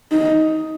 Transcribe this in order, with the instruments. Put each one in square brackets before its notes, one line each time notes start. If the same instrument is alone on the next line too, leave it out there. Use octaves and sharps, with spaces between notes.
[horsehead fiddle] D#4